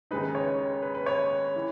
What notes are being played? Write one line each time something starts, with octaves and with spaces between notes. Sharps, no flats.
D#2 C#3 G#3 D#4 B4
B4
C#5
B4
B4
C#5
E3